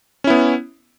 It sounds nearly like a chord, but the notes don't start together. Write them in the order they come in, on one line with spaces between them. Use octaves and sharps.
C#4 E4 B3